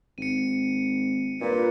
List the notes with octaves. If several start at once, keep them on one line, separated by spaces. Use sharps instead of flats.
G#1 C#7 D#7
G2 A#2 B4